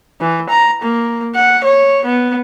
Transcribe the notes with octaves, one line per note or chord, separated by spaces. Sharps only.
E3
A#5
A#3
F#5
C#5
B3